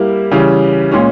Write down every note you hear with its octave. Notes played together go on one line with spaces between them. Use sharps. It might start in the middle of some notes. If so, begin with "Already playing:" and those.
Already playing: G3 A#3 E4
C#3 E3 G3 C#4
A#2 G#3 C#4